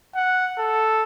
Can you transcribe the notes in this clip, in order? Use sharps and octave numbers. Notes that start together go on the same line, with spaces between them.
F#5
A4